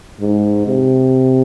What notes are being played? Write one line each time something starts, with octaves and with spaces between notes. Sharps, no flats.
G#2
C3